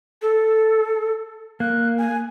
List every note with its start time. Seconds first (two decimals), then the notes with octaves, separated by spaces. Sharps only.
0.22 A4
1.60 A#3 F#6
1.98 G#5